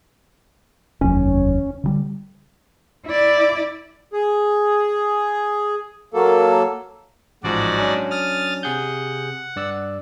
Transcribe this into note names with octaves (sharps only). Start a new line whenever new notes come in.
F1 D#2 F#3 C#4
D3 D#3 G3
E4 D5
G#4
F#3 A#3 A4
A1 G#2 F3 F#4 D5
F#3 C#4 D4
D#6 F6 A6
C3 G#4 F#5 G6
G2 D5 E6